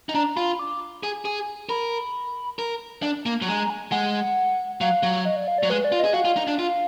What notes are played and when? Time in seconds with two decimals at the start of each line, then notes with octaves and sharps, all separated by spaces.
0.09 D#4
0.15 D4 A#5
0.36 F4 B5
0.59 D6
1.03 G#4
1.25 G#4
1.69 A#4 B5
2.59 A#4
3.03 D4
3.26 A#3
3.42 F#3
3.48 G#3 A#5
3.70 G#5
3.92 G#3 F#5
4.81 F#3 F5
5.03 F#3
5.25 D#5
5.36 D5
5.48 F5
5.58 F#3 D5
5.70 G#3 B4
5.84 D5
5.92 F4
5.99 D#5
6.05 G#4
6.14 F#4 F5
6.25 F4
6.37 D#4
6.48 D4
6.59 F4